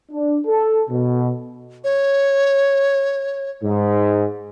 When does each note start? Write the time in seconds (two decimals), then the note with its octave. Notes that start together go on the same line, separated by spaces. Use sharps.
0.12 D4
0.47 A4
0.89 B2
1.84 C#5
3.64 G#2